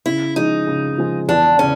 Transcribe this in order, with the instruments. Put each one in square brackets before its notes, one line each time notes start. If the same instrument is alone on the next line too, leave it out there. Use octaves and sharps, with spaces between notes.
[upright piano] C#3 [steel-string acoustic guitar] E4
[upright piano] F3 G#3 [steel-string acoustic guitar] D#4
[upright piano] C#3
F3 G#3
[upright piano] E2 [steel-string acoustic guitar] D4
[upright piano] C#3 [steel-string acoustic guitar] C#4